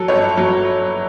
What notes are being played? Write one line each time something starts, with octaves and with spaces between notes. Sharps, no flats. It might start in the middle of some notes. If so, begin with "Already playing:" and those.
Already playing: F#3 A4
G1 C#5
F#3